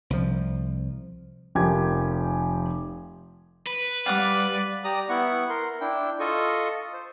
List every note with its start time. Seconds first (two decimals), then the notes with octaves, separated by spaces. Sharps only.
0.10 C2 F3
1.55 F1 F3 G4 A#4 G#5 G#6
3.66 B4
4.06 G3 D5 F5 F#5 D6
4.84 G4 D5 A#5 D#6
5.09 B3 E4 F#5 C#6
5.49 A#4 C6
5.81 D4 E4 G5
6.20 F4 A4 D#5 C#6
6.93 C5